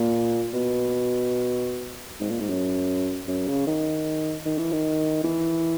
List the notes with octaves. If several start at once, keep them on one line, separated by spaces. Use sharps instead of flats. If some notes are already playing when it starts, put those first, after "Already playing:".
Already playing: A#2
B2
G#2
A#2
G#2
F#2
F#2
C#3
D#3
D#3
E3
D#3
E3